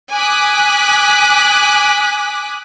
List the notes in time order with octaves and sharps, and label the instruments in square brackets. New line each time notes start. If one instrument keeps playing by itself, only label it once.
[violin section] G#5 D6 D#6 F#6 B6